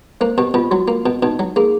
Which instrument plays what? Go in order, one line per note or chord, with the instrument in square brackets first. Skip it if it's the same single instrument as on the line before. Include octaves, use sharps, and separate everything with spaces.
[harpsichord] A#3 [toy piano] C5
[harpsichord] B2 [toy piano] G4
[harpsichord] B2 [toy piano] F4
[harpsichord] F#3 [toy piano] F#4
[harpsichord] A#3
B2
[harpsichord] B2 [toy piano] D#4
[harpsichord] F#3
[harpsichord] A#3 [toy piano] G#4